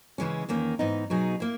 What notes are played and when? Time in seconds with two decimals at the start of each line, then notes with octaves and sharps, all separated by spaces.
0.18 C#3 E3 G#3 C#4
0.49 E2 D#3 A#3 C#4
0.79 G#2 E3 B3 D#4
1.10 B2 F#3 B3 D#4 G#4
1.40 A#3 E4